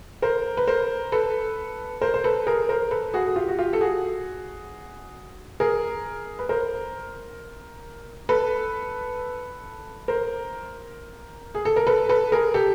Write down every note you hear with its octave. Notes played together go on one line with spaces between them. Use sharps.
A#4 C5
B4
A#4 C5
A4 B4
A#4 C5
C5
A4 B4
G#4 A#4
A#4 C5
A4 B4
F#4 G#4
G#4
F4 G4
F#4
F4 G4
A4
F#4 G#4
G#4 A#4
B4
A#4 C5
A4 B4
A#4 C5
G#4
A4
A#4
A4 B4
A4 B4
G#4 A#4
G4 A4